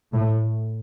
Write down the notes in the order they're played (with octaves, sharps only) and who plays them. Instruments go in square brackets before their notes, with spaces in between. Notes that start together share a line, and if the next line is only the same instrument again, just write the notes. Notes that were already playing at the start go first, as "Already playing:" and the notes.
[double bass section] A2